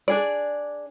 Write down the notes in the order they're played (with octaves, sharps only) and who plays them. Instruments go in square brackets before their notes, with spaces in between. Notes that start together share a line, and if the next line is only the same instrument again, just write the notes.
[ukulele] D4 G#4 D5